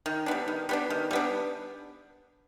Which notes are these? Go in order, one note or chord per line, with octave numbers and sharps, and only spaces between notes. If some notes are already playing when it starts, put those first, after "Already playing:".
D#3
G3 B3 D4
D#3
G3 B3 D4
D#3
G3 B3 D4